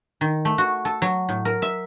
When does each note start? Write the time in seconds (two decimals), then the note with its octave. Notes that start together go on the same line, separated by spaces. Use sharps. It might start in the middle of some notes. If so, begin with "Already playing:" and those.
0.21 D#3
0.45 A3
0.58 F#4
0.85 A4
1.02 F#3
1.29 A2
1.45 A#4
1.62 E5